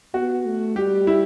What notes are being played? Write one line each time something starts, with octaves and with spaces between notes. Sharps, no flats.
B3 F#4
A3
G3 G4
E4